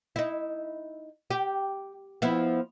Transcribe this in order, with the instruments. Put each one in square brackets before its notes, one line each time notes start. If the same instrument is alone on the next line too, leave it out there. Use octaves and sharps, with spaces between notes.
[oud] D#4 E4
G4
F3 B3 E4